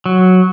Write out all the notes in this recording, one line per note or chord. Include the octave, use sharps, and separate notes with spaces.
F#3